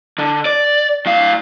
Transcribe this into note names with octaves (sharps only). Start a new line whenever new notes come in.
D3
D5
A2 F5